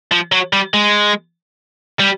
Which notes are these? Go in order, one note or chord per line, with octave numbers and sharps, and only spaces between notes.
F3
F#3
G3
G#3
G3